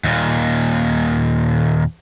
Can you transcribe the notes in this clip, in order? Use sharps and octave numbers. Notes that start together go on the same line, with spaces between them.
D#2 A#2